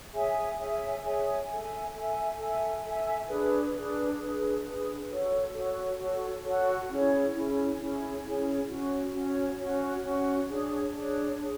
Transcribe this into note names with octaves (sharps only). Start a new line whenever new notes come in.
G#4 C#5 E5 G#5
G#4 C#5 E5 G#5
G#4 C#5 E5 G#5
A4 E5 G#5
A4 E5 G#5
A4 E5 G#5
A4 E5 G#5
D4 G#4 B4
D4 G#4 B4
D4 G#4 B4
D4 G#4 B4
F#4 A4 C#5
F#4 A4 C#5
F#4 A4 C#5
F#4 A4 C#5
C#4 E4 G#4 C#5
C#4 E4 G#4 C#5
C#4 E4 G#4 C#5
C#4 E4 G#4 C#5
C#4 F#4 C#5
C#4 F#4 C#5
C#4 F#4 C#5
C#4 F#4 C#5
D4 G#4 C#5
D4 G#4 C#5
D4 G#4 C#5